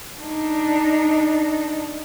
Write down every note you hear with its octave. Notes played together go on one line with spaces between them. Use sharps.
D4 D#4